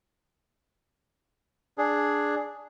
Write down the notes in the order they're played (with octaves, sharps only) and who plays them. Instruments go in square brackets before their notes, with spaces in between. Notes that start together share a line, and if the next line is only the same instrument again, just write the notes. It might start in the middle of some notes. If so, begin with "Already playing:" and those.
[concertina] D4 G#4